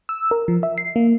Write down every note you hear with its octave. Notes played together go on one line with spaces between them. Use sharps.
E6
A#4
F3
E5
C7
A#3